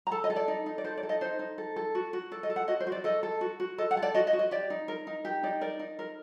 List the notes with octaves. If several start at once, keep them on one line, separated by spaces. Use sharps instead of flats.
A#5
A4 A5
D#5
A4
D5
D#4
D#4
D5
A4 C5
D5
A4
D#5
D#4 C5
D#4
A4
A4
F#4
F#4
A4 D5
D#5
A4
F#5
F#4 D#5
C5
F#4
D5
A4 D#5
A4
F#4
F#4
A4 D#5
F#5
A4
D5
F#4 D#5
D#5
F#4
D#5
G4 D5
D#4
A#4
D#4
G4
D#4 D5
A#4 D5
D#4
A#4